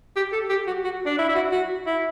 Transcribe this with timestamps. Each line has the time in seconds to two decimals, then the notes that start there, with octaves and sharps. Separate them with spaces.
0.16 G4
0.33 A4
0.50 G4
0.67 F#4
0.84 F#4
1.06 D4
1.19 E4
1.29 E4
1.35 F#4
1.52 F#4
1.87 E4